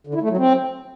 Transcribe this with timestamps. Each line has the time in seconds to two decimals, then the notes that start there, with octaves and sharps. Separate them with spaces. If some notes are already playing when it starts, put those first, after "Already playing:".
0.07 D3
0.14 E4
0.22 A3
0.30 F#3
0.37 C4